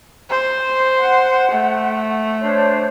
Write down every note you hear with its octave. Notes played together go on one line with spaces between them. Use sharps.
C5
F#5
A3
D4 C5 C#5